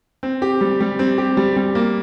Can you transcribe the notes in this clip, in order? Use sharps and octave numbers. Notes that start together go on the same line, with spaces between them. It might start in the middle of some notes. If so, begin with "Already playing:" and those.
C4
G4
G3
G3
C4
G4
G3
G3
A#3